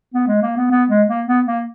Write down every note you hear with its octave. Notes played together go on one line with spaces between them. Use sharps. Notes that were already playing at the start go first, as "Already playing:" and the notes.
B3
G#3
A#3
B3
B3
G#3
A#3
B3
A#3